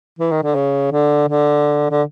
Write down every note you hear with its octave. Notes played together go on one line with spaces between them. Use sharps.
E3
D#3
D3
C#3
D3
D3
D3